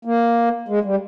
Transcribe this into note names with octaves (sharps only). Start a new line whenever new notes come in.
A#3
G#3
G3